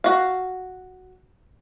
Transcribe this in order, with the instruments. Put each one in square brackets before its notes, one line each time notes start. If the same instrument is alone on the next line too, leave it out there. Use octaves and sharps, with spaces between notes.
[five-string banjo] F#4 F5